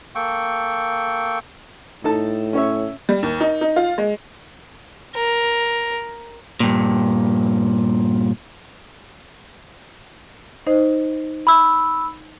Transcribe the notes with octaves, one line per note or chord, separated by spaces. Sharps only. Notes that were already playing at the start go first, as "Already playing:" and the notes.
A#3 A4 G5 C#6
A2 D#4 A4 A5
C#4 C#5 E5
G3
D#2
D#4
D#4
F4
G#3
A#4
G2 A#2
D#4 C5 D#5
B5 E6